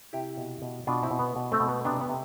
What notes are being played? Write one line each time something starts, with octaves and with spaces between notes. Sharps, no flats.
C3 E4 G4
B2
B2
B2 D4 F4
C4 E4
B2
B3
B2
A3 C4
B2
B3
C3 B3 D4
B3
C3